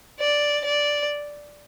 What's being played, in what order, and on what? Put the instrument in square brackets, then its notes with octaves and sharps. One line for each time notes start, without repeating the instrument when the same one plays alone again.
[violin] D5
D5